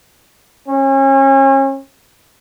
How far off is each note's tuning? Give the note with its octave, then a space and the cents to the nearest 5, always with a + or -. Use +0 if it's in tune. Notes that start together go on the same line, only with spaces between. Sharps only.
C#4 -35